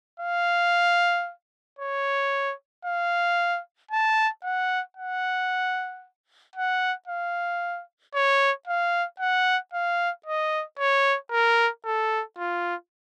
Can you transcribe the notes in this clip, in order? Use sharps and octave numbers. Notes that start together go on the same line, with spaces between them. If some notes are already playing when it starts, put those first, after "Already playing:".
F5
C#5
F5
A5
F#5
F#5
F#5
F5
C#5
F5
F#5
F5
D#5
C#5
A#4
A4
F4